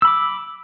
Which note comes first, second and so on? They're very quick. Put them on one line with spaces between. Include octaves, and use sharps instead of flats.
E6 B5 D6